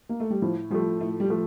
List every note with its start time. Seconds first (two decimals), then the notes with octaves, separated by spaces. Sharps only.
0.09 A#3
0.20 A3
0.30 G3
0.42 A2 F3
0.70 F3 G3 A3
1.00 A2 A3
1.20 G3
1.30 F3 A3